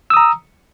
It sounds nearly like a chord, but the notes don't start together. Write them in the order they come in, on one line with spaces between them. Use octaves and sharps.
E6 D#6 A#5